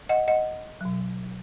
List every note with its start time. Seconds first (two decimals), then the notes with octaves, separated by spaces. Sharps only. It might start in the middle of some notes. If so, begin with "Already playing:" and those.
0.09 D#5 F#5
0.28 D#5 F#5
0.81 B2 F#3